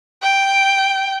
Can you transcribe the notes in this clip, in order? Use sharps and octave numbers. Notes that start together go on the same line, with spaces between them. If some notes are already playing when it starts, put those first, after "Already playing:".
G5